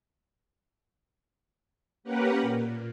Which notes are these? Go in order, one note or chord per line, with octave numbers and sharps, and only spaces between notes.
A#3 C#4 G4 A#4 B4 F#5
A#2